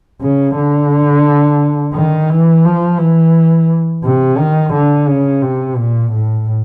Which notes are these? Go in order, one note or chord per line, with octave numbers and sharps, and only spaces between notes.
C#3
D3
D#3
E3
F3
E3
C3
D#3
D3
C#3
C3
A#2
A2